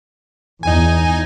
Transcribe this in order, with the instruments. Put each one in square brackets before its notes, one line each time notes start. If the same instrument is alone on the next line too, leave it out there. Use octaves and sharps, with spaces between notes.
[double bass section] E2 [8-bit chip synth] D#4 G#5